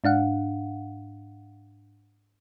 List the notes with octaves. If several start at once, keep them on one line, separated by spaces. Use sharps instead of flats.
G#2 D4 F5 F#5